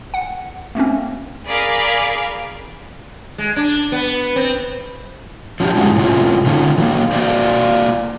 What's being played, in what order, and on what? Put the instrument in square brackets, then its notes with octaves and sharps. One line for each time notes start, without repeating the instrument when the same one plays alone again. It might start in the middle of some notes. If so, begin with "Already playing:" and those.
[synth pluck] F#5
A3 A#3 C4 C#4
[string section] G#4 A#4 D5 F5 B5 D6
[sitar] G#3
D4
B3
C4
[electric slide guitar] F3 C#4 D4 F4 G4
G2 D3 G#3 C#4 E4 F#4
A2 C3 C#4 F4
A2 D3 C#4 D#4 F4
E3 F#3 A#3
A#3 F#4 C5 D5 D#5 F5